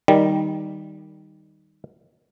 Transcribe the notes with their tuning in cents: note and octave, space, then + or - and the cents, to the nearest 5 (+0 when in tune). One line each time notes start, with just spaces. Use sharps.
D#3 +0 G3 +0